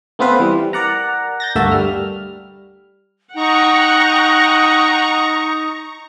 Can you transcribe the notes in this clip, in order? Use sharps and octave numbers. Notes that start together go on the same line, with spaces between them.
A3 B3 C4 F4 B4 F5
E3 G3
A#4 D5 F#5 A#5
G6 A6 A#6
D2 G2 A3 A#3 F#4 E5
G3 F6
D#4 F#5 G5 A#5 C#6